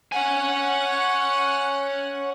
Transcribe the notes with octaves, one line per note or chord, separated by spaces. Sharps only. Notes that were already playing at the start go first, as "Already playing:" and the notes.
C#5 F#5 G#5